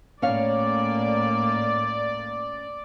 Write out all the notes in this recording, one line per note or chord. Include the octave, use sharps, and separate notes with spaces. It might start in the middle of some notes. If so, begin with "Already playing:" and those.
A2 A#3 C#4 C#5 D5 F5